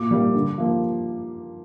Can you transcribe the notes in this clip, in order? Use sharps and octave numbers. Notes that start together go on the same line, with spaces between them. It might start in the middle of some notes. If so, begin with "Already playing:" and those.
Already playing: A#2 D6
G3 A#3
D3
F3 A#3